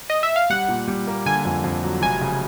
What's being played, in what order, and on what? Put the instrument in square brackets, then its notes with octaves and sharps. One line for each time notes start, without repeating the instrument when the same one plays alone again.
[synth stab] D#5
E5
F5
[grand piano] G3 [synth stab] F#5
[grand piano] A#2
G3
A#3
[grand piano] D3 [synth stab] G#5
[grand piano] F2
F2
F#3
[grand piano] F1 [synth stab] G#5
[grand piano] C#3